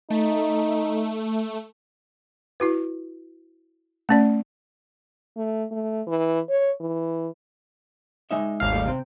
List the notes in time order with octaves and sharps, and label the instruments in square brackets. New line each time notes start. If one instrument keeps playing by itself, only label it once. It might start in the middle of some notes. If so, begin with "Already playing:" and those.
[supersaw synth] A3 [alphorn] D#4
[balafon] E4 F#4 B4
A3 C#4 D5
[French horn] A3
A3
E3
C#5
E3
[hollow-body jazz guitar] G#3 D#4 E5
[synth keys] G#1 D#2 F5
[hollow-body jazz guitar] G3 A3
C3 C4